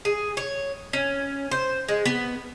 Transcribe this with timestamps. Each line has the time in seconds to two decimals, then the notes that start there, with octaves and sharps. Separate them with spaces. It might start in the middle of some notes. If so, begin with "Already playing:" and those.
0.05 G#4
0.37 C#5
0.93 C#4
1.51 C5
1.88 G#3
2.06 B3